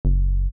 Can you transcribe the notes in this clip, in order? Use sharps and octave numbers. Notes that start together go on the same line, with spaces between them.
F#1